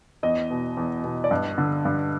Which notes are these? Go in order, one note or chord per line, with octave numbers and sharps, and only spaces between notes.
E2 D#5
B2
E2
B2
D5
G2 D#5
D3
G2